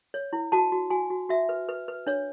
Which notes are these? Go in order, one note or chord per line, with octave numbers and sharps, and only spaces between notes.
C#5
E4
F#4 A5
F#4
F#4 G#5
F#4
F#4 E5
B4
B4
B4
D4 C#5